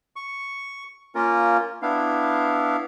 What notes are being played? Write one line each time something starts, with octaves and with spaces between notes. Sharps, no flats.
C#6
A#3 C#4 F4 A#4
B3 D4 E4 F5